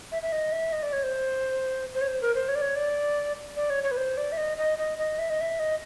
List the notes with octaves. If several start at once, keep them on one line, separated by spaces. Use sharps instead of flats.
E5
E5
D#5
E5
D#5
D5
C#5
C5
C5
C#5
C5
A#4
C5
C#5
D5
C#5
D5
D5
C#5
C#5
B4
C5
D5
E5
D#5
D#5
D#5
D#5
E5
D#5
E5
D#5